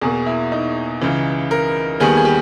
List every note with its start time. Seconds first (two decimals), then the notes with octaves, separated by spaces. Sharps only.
0.02 E2 B2 A#3 G#4
0.26 E4
0.52 D#4
1.01 C#2 C#3 E3
1.51 A#4
2.00 D#2 D#3 G3 B3 G#4
2.17 G#4
2.25 G4